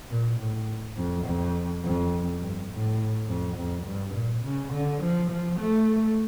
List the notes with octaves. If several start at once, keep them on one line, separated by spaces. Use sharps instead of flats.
A#2
A2
F2
F2
F2
G2
A2
F2
F2
G2
A#2
C#3
D3
F3
F3
A3